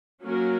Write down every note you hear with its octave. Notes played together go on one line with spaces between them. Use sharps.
F#3 A#3 C#4 F#4 A#4